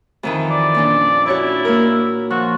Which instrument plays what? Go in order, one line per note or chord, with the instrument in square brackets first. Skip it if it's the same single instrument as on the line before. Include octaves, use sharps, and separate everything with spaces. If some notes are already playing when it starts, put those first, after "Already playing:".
[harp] F2 D#3 E3
[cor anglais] D5
[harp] A#2 C#4 D4
[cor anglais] E4 [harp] F#4 C#5 D5
[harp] A#3 A#4
[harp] F3 [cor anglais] F#4